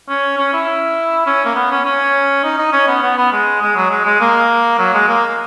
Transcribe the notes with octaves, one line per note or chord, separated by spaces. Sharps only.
C#4
C#4
E4
C#4
A#3
B3
C#4
C#4
D#4
D#4
C#4
B3
B3
B3
G#3
G#3
F#3
G#3
G#3
A#3
F#3
G#3
A#3